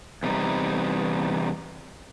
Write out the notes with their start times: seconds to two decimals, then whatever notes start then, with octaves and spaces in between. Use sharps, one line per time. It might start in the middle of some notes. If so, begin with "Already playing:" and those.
0.23 E2 C3 G3 D#4